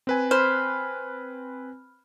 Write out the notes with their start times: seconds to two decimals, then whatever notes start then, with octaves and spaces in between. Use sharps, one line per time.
0.07 C4 B4 G#5
0.31 C5 B5 F6 F#6